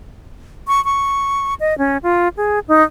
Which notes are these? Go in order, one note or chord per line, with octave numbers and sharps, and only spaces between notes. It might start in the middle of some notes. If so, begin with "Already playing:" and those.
C#6
C#6
D#5
C#4
F4
G#4
D#4